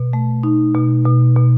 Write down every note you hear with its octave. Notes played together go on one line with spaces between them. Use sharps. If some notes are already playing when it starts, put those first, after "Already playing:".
Already playing: B2
A3
D#4
B2
B2
B2